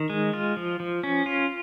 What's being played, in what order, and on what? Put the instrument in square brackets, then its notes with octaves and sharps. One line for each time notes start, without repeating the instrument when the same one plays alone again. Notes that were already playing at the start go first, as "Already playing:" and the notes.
Already playing: [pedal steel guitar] D#3
G#3
F4
F3
F3
C#4
F4